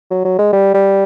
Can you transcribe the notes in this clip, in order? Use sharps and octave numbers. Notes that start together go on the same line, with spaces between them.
F#3
F#3
G#3
G3
G3